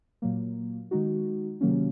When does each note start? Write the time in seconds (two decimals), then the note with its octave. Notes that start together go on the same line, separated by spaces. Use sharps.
0.22 A#2 F#3 A#3
0.91 D#3 G#3 D#4 F#4
1.61 C3 D#3 F#3 A#3 C#4